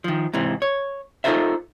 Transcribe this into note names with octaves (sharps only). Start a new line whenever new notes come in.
D#3 F3
G#2 C3 E3
C#5
D#4 F4 A4 A#4 C5 E5